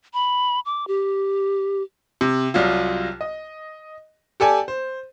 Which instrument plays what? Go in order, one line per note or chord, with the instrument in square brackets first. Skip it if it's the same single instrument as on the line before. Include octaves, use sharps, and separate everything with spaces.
[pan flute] B5
D6
G4
[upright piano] C3
C2 C3 F#3 F4
D#5
G4 A4 D5 G#5
C5